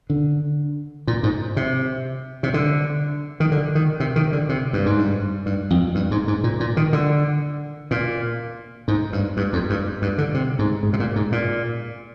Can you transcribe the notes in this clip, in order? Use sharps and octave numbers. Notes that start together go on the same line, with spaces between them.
D3
A#2
G#2
C3
C3
D3
D#3
D3
D#3
C3
D#3
D3
C3
G2
G#2
G2
G2
F2
G2
G#2
G#2
A#2
A#2
D#3
D3
A#2
G#2
G2
G2
F2
G2
G2
D3
C3
G#2
G#2
C3
A#2
G#2
A#2